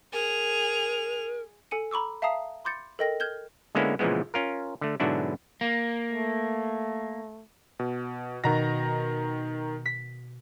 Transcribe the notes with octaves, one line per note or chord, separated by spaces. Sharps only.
G#4 A#4 F7
A4 G#5 C#7 D#7
A#5 B5 C#6 D6 E6
E5 F5 A5 A#5 D#6 C7
B5 C6 D6 G6 A6 C#7
A4 A#4 D#5 G5 A#6
F6 G6 G#6 G7
D3 G#3 A#3 B3 C#4 E4
A#2 C#3 E3 F3 G#3 B3
C#4 F4 A#4
D3 A3
G#2 B2 D3 F#3 D4 E4
A#3
A3
B2
B2 D#3 A#5 A#6
B6